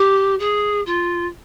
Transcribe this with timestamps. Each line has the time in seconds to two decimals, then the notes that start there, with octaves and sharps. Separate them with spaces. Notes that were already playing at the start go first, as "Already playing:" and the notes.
Already playing: G4
0.39 G#4
0.86 F4